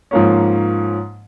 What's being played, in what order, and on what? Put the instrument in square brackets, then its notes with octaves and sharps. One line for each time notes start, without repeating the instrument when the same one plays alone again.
[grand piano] G#2 F3 A#3 C#4